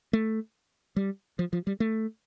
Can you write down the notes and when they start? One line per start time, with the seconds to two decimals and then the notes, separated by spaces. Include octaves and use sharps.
0.13 A3
0.96 G3
1.39 F3
1.53 F3
1.67 G3
1.80 A3